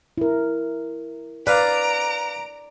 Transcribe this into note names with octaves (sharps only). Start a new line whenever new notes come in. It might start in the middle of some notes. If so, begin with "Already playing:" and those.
E4 A#4
B4 D5 F5 A#5 D7